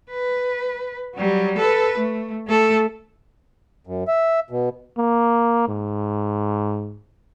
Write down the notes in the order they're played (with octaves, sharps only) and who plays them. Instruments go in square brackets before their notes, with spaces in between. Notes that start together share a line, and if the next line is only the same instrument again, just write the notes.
[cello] B4
F#3 G3
A4 B4
A3
A3 A4
[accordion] F#2
E5
B2
[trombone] A#3
G#2